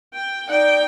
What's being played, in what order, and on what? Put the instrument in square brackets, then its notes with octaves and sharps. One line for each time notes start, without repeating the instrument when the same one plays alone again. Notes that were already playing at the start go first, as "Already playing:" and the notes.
[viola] G5
[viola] D#4 G5 [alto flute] D5